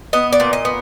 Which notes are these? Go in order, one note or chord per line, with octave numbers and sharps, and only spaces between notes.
B3 D#5
D5
A#2
D#5
B3